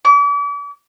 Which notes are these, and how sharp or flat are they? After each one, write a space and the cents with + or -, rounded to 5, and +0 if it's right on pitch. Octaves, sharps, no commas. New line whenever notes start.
D6 -40